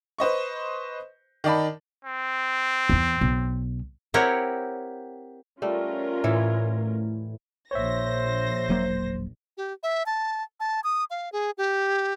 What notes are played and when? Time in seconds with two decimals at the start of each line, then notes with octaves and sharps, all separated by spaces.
0.19 B4 C5 D#5 C#6
1.44 D#3 D#4 D5 A5 B5
2.05 C4
2.89 E2 E3
3.21 B1
4.14 C4 E4 G4 A#4 C#5 F#5
5.62 G3 A3 C#4 F4 A#4
6.24 A2 E3 E4 C#5
7.71 A#1 C5 C#5 E5 A#6
8.69 E1 F#3 A#3
9.57 G4
9.83 E5
10.06 A5
10.60 A5
10.84 D#6
11.11 F5
11.32 G#4
11.58 G4